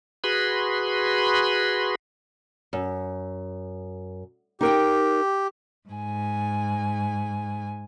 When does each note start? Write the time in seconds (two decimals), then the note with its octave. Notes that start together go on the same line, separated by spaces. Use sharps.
0.24 F#4 G#4 B4 B5 C6
2.73 F#2
4.61 D#4 G4 A#4 G5
5.89 G#2 G#5